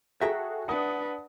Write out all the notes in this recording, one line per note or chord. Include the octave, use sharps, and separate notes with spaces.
F#4 G#4 A4 E5 G5 A#5
D4 B4 F#5 D#6